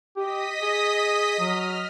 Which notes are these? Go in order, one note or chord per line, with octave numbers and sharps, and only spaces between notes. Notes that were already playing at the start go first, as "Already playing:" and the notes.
G4 D#5 D#6 B6
G#4
F#3 F6